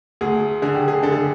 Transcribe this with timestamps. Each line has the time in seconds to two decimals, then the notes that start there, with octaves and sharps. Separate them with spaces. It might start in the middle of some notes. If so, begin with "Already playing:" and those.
0.21 D2 G#4
0.62 D3 G#4
0.75 G4
0.88 G#4
1.03 D3 A4
1.12 G#4